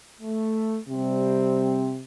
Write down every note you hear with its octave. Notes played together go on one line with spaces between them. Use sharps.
A3
C3 G3 C4